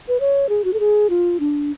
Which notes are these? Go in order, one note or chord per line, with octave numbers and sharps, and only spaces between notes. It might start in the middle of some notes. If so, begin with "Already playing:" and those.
B4
C#5
G#4
F#4
A4
G#4
F4
D4